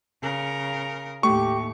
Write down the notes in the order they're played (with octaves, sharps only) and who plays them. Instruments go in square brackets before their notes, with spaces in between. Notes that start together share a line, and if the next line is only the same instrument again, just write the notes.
[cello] C#3 A#4
[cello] D#2 A2 [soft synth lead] A3 [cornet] G4 [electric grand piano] C#6